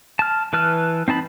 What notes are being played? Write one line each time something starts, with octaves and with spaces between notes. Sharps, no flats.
A5 F6
E3 B4 A5 F6
C4 D#4 A5 B5